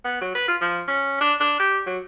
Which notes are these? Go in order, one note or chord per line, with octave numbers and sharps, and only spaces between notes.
B3
F#3
B4
F4
F3
C#4
D4
D4
G4
F#3